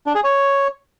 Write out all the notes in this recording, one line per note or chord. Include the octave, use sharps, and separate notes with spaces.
D4
G#4
C#5